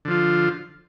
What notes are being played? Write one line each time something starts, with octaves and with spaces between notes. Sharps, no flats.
D3 F3 F4